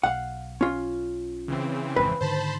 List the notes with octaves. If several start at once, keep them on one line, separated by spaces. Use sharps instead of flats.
B1 F5 F#5
C#4 F4
C#3 E3 C4
G#1 F2 G#2 B4
G#2 D3 D#3 C5 A5 B5